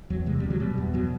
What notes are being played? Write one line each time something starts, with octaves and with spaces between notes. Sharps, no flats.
E2 F#3
C3 G#3
G3
D2
F#3
B2 G3
E2
B2 F#3